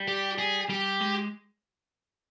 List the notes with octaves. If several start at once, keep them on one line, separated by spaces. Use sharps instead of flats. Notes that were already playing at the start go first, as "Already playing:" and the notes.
Already playing: G3
G4
G#4
G3 G4
G#3